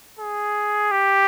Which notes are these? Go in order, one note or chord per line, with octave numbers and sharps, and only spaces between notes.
G#4
G4